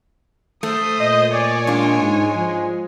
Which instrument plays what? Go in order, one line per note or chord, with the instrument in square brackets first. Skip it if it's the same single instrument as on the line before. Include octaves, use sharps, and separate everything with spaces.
[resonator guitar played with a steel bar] A3 [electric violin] C5 D#6
[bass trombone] A#2 [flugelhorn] D#5
[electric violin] C#5 G#5 [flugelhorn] D5
[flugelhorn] G#3 [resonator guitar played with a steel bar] D4 F4
[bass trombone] G#2
F3